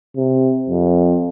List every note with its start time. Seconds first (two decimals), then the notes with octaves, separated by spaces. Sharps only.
0.17 C3
0.69 F2